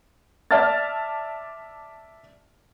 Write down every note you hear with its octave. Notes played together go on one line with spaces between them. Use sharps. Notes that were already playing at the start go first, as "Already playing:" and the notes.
D5 E5 A5 F6 A6